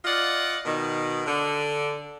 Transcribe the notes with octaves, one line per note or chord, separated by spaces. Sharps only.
F4 D5 D#5 F5 F#5
B2 D#3
D3